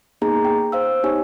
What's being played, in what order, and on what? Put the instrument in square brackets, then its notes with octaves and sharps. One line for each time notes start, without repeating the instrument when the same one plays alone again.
[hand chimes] A#3 B3 D#4 G#4 A#5
G5
C5 F5 E6
B3 D#4 G4 C#5 G#5